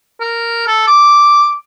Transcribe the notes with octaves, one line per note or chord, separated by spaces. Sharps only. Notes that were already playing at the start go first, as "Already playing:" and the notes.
A#4
A4
D6